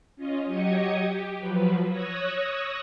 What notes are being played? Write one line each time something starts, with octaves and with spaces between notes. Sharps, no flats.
C#4 F4 D#5
F#3 G4 D#5 D#6 G#6 C#7
G4
F3 F#3 B4
C#5 D#6 E6 F#6 G#6 A#6